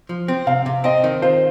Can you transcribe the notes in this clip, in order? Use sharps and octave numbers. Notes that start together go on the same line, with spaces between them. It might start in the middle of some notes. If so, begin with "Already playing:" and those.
F3
C4
C3 F5
C3
C4 D#5
D#3
F4 C5